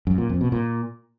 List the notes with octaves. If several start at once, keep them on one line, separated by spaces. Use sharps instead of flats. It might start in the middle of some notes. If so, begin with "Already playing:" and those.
F#2
A#2
F2
B2
A#2